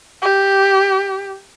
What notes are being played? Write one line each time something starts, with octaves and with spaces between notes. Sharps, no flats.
G4